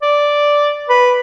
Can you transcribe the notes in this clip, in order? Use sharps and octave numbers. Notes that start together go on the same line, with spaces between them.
D5
B4